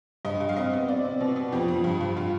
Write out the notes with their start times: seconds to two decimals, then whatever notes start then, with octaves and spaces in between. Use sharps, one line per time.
0.25 G2 D#5
0.40 G2
0.49 F5
0.57 C3 D#5
0.73 B3
0.88 C3 D5
1.05 C3
1.21 B2
1.36 B3
1.52 F2 G4
1.68 F2
1.84 G2
2.01 G2
2.17 F4